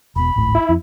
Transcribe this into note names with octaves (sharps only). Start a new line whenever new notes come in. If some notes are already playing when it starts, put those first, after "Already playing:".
E1 B2 B5
D1 G#1 A2
E4
F2